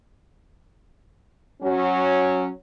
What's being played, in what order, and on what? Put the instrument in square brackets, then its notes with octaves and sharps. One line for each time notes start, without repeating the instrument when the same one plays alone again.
[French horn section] F#3 C#4